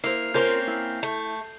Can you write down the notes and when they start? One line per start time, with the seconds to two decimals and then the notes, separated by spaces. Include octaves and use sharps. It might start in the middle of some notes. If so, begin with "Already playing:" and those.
0.04 A#3 E4 C5 C7 F7
0.34 A#3 C4 C#4 F4 A#4 C5 G6
0.67 E4
1.03 A3